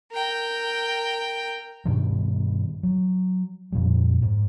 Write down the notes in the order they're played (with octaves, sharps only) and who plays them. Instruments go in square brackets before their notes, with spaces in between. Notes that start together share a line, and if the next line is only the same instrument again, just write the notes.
[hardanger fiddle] A#4 G5
[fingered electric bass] G2 B2 D#3 G3
F#3
F2 A#2 G3
G#2